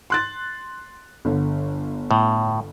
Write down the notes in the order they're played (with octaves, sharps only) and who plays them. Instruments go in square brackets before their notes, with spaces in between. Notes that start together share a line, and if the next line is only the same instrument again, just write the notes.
[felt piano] C6 F#6 A6
G1 D3
[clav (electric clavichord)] A2